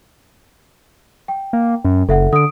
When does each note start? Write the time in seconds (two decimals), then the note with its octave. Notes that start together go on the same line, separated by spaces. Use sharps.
1.28 G5
1.53 A#3
1.85 F#2
2.09 F#1 A4 E5 F#5
2.33 D3 D#6 D7